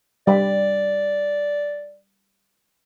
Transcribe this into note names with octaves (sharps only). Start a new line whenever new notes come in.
G3 D5 B5